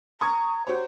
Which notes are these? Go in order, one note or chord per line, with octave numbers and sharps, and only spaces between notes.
A#5 C#6 D#6 G#6
F#4 G4 C5 C#5